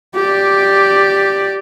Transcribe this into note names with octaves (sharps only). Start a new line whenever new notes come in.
G4 D5